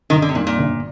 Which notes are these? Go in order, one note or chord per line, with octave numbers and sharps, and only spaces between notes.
G1 D#3
D3
C3
F2 A#2 D#3 G3 D4
A#2
G1